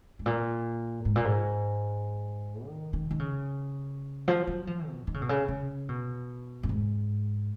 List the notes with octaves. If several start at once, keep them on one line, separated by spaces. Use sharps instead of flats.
G#2
A#2
G#2
A#2
G#2
D#3
D#3
D#3
C#3
F3
F#3
F3
B2
D#3
C#3
B2
C#3
C#3
B2
F#2
G#2